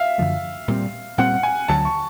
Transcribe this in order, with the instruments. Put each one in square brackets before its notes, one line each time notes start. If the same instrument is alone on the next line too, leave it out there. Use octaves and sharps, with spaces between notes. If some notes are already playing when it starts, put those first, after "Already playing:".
Already playing: [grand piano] E5 F5
[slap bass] F#2 D3 F3 A3
A#2 G3 C4
[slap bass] A#2 G3 C4 [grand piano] F#5
[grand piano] G#5
[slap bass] D2 D3 F#3 [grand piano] A5
[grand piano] C#6